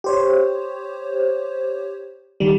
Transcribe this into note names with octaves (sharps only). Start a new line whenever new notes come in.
G4 C5 C#5
D#3 G3